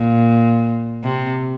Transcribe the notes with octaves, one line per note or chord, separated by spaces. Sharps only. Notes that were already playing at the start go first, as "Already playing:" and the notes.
Already playing: A#2
C3